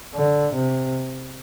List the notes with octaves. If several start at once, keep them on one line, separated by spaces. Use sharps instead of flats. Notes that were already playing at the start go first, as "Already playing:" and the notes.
D3
C3